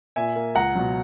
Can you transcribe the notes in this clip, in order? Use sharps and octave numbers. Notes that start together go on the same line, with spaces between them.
A#2 E5 G#5
A#3
C#2 F#5 A#5
B2 F#3